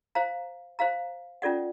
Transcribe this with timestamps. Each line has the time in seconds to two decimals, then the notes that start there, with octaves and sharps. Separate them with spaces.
0.15 C5 F5 A#5
0.79 C5 F5 A#5
1.42 C#4 F4 A4 D5 F#5